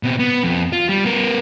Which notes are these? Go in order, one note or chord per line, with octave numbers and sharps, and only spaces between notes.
B2 C4
B3
F2
F4
G3
B3 A#4